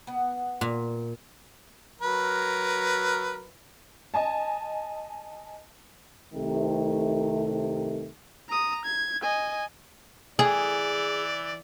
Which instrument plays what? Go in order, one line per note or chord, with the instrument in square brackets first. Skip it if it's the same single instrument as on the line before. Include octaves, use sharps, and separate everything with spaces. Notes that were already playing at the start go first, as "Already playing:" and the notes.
[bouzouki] B3 F#5
[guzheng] A#2
[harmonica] F#3 A#4 B4
[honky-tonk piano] D#5 G#5 A5
[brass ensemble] C2 C3 D#3 A3
[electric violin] A#5 D#6
G#6
D#5 G#5
[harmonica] E3 D5 [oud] G#4